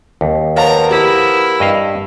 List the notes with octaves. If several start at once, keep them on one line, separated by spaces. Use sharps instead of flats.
D#2
F3 B3 A#4 C#5 F5 A5 A#5
E4 G4
G2 D#5 F5